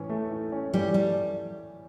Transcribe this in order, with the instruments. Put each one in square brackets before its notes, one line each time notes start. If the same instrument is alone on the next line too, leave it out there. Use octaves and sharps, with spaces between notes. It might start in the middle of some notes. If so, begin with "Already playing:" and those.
Already playing: [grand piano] A2 E3 C#4
A3
A2
C#4
[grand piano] E3 [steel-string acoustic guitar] G3
[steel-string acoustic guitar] G3 [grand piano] A3